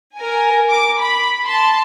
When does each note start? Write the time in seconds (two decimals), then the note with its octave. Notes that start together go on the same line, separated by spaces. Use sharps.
0.15 A#4 G#5
0.71 D6
1.01 B5
1.45 A5 C6